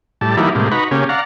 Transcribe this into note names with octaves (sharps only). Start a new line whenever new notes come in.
A2 G3 A5
E3 F#3 G3 A#3 D#4 E4
A2 C3 G3 G#3 A#3
D#4 F#4 B4 A#5 B5 C#6
C#3 A#3 C#4 G4
D5 F5 F#5 A#5